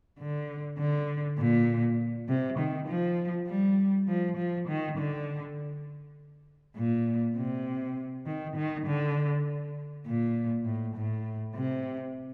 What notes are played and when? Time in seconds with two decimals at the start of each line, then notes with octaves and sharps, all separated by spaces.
0.19 D3
0.79 D3
1.38 A#2
2.28 C3
2.59 D#3
2.88 F3
3.47 G3
4.08 F3
4.37 F3
4.68 D#3
4.98 D3
6.76 A#2
7.37 C3
8.26 D#3
8.56 D#3
8.86 D3
10.06 A#2
10.65 A2
10.96 A2
11.55 C3